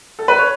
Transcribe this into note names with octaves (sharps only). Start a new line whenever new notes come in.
A4
B4
C#5